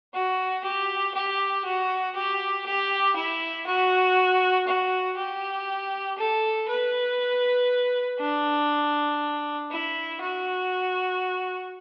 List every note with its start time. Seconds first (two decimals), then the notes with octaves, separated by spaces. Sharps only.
0.13 F#4
0.64 G4
1.14 G4
1.64 F#4
2.15 G4
2.66 G4
3.16 E4
3.66 F#4
4.67 F#4
5.17 G4
6.18 A4
6.68 B4
8.19 D4
9.71 E4
10.21 F#4